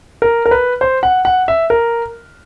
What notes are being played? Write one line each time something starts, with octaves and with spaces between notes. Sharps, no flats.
A#4
A#4
B4
C5
F#5
F#5
E5
A#4